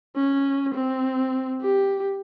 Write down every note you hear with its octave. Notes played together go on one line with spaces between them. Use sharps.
C#4
C4
G4